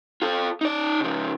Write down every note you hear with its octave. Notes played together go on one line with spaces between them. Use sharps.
F4 A4
D#4 D5
C#3 F3